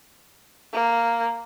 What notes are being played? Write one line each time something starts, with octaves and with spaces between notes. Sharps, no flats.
A#3